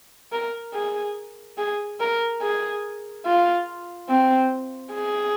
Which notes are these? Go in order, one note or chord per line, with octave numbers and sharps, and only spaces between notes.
A#4
G#4
G#4
A#4
G#4
F4
C4
G#4